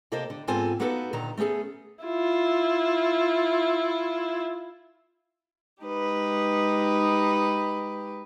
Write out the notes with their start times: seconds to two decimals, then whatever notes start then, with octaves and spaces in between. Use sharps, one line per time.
0.12 C3 A#3 A4 A#4 C5 D#5
0.30 D3
0.47 G#2 B3 C4 F4 A4 G#5
0.79 A#3 B3 D#4 F#4 A4 B4
1.13 A#2 D3 D#3 A#5
1.37 A3 B3 C#4 G#4 A4
2.04 E4 F4
5.83 G#3 D#4 G4 B4